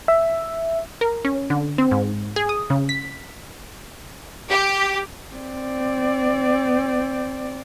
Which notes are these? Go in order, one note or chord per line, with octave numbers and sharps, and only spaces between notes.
E5
A#4
C#4
D3
C4
G#2
G#4
D#6
C#3
B6
G4
C4 D5